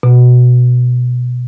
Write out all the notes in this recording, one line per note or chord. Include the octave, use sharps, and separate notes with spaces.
B2